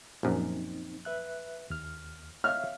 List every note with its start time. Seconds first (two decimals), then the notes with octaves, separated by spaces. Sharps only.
0.23 A#1 F#2 C4 D#4
1.05 B4 E5 F#6
1.70 D#2 F6
2.44 C#5 E5 F5 F6